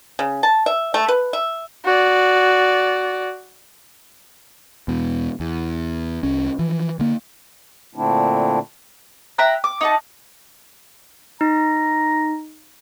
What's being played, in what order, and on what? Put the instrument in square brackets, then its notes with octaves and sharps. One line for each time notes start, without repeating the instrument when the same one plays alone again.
[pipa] C#3
A5
E5
A3
B4
E5
[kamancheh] F#4 D5
[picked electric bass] E2 B2
E2
C2 C#4
E3 F3
D3 A#3
[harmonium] A#2 D3 A3 C4 D4 E4
[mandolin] E5 G5 A#5 F#6
D6
D#4 F#5 A5
[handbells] D#4 [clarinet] A#5